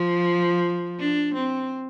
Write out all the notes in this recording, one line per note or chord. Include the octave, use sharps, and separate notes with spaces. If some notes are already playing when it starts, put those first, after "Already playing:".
Already playing: F3
D4
C4